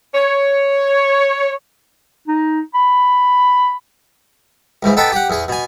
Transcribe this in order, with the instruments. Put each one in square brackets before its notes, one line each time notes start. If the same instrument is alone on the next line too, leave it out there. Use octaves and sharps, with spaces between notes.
[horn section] C#5
[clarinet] D#4
B5
[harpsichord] C#2 G#2 E3
B3 D#4 A4 B4 G5
G4 F#5
E2 G#4
B2 G#5